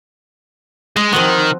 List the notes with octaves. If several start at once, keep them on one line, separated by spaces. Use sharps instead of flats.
G#3 D#5
D#3 F3 C4 F#4